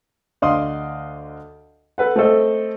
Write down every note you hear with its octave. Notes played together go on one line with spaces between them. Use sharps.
D2 D5 D#5 F5 C6 D#6
A4 B4 F#5
A3 C4 A4 D#5